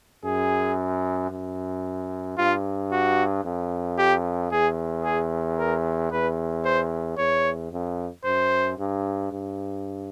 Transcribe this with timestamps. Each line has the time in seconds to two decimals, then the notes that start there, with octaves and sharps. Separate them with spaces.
0.24 F#2 G#4
1.31 F#2
2.38 G2 F4
2.92 F#4
3.45 F2
3.98 G4
4.51 E2 G#4
5.04 G#4
5.59 A#4
6.12 E2 B4
6.65 C5
7.18 E2 C#5
7.72 F2
8.25 F#2 C5
8.78 G2
9.31 G2